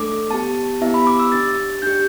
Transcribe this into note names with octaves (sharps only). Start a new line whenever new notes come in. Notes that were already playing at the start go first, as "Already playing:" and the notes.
Already playing: A3 D4 A4 D6
B3 G4 A5
B3 E4 G4 E5
B5
D6
E6
D4 G4 A6
D4 G4 G6